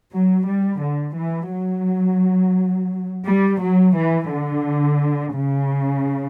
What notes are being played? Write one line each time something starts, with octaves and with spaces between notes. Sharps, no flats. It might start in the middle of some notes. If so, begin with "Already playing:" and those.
F#3
G3
D3
E3
F#3
G3
F#3
E3
D3
C#3